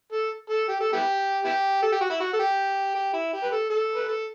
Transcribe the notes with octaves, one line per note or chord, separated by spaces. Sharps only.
A4
A4
G4
A4
B3 E4 G4
B3 E4 G4
A4
G4
F#4
E4
F#4
A4
G4
G4
E4
G4
B4
A4
A4
B4
A4